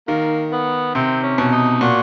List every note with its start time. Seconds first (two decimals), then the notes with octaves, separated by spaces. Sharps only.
0.08 D#3 A#3
0.52 B3
0.95 C3 C4
1.23 C#4
1.38 B2
1.52 D#4
1.81 A#2 F#4